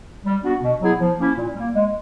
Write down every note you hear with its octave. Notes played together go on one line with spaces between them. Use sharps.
G3
B3 D4 F#4
B2
F#3 B3 E4 G#4
F3
A#3 C#4 E4
A#2
G3 A#3
G#3